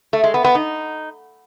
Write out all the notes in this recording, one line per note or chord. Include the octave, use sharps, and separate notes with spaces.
A3
G#3
B3
B3
D#4